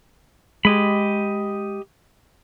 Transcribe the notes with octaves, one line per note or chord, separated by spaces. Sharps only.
G#3 G4 D#5 B5